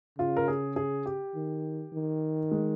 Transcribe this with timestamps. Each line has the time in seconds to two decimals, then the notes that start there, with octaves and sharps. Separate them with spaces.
0.19 C#3 F4
0.37 A#4
0.48 G#4
0.76 G#4
1.06 G4
1.35 D#3
1.93 D#3
2.51 G#3